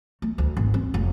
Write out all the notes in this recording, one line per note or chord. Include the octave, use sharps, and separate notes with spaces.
A3
D2
G#1
C4
F1